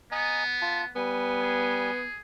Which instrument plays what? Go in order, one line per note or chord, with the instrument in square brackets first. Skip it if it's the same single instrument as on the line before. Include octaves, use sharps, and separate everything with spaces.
[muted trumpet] B3 [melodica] D#5 G#5 A#5
[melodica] F4 A5
[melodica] G3 G#5 [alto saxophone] B3
[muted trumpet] G#4